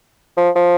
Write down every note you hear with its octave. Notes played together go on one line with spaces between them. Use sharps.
F3
F3